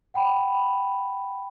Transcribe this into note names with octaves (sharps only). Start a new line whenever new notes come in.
F#5 G5 B5